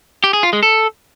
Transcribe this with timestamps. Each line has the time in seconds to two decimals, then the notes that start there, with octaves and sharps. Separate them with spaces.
0.24 G4
0.33 G#4
0.43 F4
0.53 G#3
0.63 A4